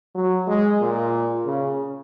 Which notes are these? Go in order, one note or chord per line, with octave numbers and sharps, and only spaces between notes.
F#3
G#3
A#2
C#3